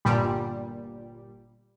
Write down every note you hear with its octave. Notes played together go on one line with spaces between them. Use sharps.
G1 A#2 G3